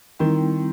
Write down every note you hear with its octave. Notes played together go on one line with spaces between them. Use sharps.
D#3 G3 C4 E4